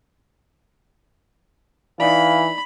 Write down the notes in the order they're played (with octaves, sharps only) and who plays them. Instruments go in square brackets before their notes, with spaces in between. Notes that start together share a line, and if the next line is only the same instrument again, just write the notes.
[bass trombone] E3 [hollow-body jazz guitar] D#4 D5 [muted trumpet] F5 [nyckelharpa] B5